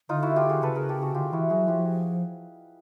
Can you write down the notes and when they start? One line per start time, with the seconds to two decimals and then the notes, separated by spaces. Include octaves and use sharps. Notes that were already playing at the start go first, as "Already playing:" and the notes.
0.09 D3 D#4 F4
0.22 E4 F#4
0.36 F4 G4
0.49 F#4 G#4
0.62 C#3 A4 B4
0.75 G#4 A#4
0.89 G4 A4
1.02 F#4 G#4
1.14 D3 F4 G4
1.32 E3 E4 F#4
1.50 F#3 F#4 G#4
1.68 F3 F4 G4
1.85 F#4 G#4